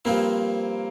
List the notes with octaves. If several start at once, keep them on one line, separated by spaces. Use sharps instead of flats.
G2 F3 A#3 C4 E4